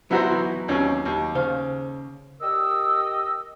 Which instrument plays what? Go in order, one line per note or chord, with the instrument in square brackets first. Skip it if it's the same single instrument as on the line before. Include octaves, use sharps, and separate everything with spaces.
[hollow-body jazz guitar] F#3 B3 D#4 [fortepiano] E4 F#4 C5
[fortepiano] E3
D#2 C4 C#4
D#2
[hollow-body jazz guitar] C#3 C5 F5
[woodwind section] G4 A#4 D#5 E6